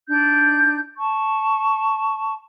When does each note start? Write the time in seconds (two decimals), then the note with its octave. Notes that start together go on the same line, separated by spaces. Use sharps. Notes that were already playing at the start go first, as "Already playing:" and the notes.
0.08 D4 D#4 G6
0.98 A5 C#6